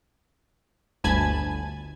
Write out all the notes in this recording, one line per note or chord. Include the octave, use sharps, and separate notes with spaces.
G1 D2 G#5 A5 B5 G#6